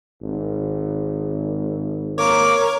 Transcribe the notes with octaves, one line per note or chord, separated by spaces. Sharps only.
G#1
A#3 A#4 C#5 D6